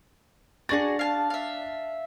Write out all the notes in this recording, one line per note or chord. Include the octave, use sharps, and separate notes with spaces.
D4 F#4 G#4 F#5 A6
F5 G#5 A5
E5 F5